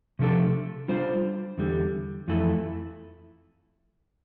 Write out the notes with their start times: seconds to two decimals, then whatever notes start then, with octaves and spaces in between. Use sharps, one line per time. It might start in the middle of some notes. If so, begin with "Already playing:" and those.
0.19 C3 F3 A3 D4 A4
0.88 G3 D4 F4 C5
1.58 E2 D3 G3
2.28 F2 E3 A3 E4